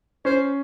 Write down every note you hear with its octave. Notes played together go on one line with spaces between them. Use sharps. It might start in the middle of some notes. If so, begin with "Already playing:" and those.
C#4 C5